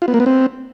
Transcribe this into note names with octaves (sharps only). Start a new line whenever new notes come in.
F4
B3
A#3
B3
C4